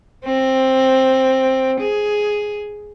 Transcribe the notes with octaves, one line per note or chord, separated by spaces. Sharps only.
C4
G#4